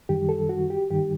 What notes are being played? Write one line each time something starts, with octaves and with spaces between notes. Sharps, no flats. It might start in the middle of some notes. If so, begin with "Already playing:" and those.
F#2 D#3 G3 G4
A4
F#4
G4
G2 D#3 G3 G4